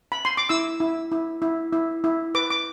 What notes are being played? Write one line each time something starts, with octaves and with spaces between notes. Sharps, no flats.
B5
C6
D6
E4 E6
E4
E4
E4
E4
E4
B4 D6
D6